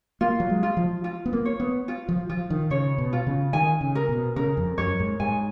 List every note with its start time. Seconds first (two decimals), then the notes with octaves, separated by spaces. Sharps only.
0.21 A#3 F4
0.40 F#3
0.50 G#3
0.63 F4
0.77 F3
1.04 F4
1.26 B3
1.33 A#3
1.45 C#5
1.60 B3
1.88 F4
2.09 F3
2.29 F3 F4
2.50 D#3
2.70 C#3 C#5
2.98 B2
3.13 F4
3.27 C#3
3.53 D#3 G#5
3.81 C#3
3.95 A#4
4.09 B2
4.36 C#3 A#4
4.57 F2
4.78 F#2 C#5
5.00 G#2
5.20 G#2 G#5